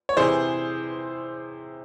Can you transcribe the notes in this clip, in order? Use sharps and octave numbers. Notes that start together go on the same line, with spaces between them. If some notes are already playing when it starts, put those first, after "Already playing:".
C#5
C3 E3 G#4 C5